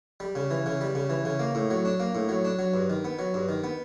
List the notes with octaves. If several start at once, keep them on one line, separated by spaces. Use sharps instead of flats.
G3
C#3
E3
C#3
G3
C#3
E3
C#3
A#3
A2
F#3
D4
A#3
A2
F#3
D4
F#3
G2
D#3
B3
F#3
G2
D#3
B3